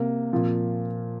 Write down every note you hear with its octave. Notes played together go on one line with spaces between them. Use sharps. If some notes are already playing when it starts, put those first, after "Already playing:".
Already playing: C3 A#3
A#2 F3 C4